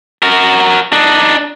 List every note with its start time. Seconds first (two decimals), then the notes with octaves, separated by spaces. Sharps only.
0.22 F#4 A#4
0.93 D4 D#4